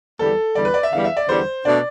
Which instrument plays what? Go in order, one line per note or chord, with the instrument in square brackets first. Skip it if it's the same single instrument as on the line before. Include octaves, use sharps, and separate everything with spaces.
[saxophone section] E2 D3 G3 [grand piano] A4
[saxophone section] E2 D3 G3 [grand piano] D5
[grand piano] B4
D5
E5
[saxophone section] E2 D3 G3 [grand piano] F5
[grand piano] E5
D5
[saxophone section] E2 D3 G3 [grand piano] C5
[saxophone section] B2 A3 D4 [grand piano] D5